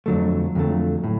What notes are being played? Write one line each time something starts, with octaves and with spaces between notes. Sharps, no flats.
F2 D3 F#3 A3
F2 D3 F#3 A3
A2